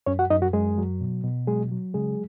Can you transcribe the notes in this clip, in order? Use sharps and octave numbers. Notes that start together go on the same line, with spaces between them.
F#2 C#4 C#5
F#4 F#5
F#2 D#4 D#5
F#3 F#4
F#2 G#3 G#4
F#3
B2
B2
F#3 G#3 G#4
F#3
C#3 G#3 G#4